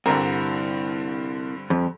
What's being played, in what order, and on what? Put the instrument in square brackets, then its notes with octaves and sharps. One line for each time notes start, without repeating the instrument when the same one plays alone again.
[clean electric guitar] C2 [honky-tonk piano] G2 D3 C4 [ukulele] A#4
[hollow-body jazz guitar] F2